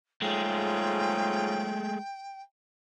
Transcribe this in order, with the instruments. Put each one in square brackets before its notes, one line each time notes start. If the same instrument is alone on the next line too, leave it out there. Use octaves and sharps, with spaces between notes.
[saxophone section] G#2 C#4 F4 [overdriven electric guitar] G#3 A3 [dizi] G5